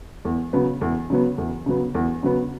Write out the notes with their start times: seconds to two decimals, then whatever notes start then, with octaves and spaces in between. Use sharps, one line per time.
0.25 E2
0.53 C#3 F#3 B3
0.81 E2
1.10 C#3 F#3 B3
1.38 E2
1.66 C#3 F#3 B3
1.95 E2
2.23 C#3 F#3 B3